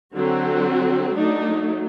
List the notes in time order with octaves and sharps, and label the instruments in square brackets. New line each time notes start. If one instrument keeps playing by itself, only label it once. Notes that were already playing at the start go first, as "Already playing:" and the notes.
[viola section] D3 F#3 C4 F#4
F#3 A3 D4 D#4